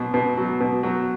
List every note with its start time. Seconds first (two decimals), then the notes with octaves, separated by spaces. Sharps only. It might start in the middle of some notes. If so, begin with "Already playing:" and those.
Already playing: B2 F#3
0.14 B2
0.37 F#3
0.60 B2
0.83 F#3